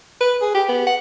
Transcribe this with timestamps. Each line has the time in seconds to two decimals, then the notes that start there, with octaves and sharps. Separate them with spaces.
0.20 B4
0.42 G#4
0.55 G4
0.69 B3
0.87 F#5